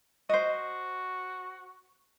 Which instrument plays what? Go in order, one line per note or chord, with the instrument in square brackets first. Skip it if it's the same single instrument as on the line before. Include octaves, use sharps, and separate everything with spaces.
[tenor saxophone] F#4 [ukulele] C5 D#5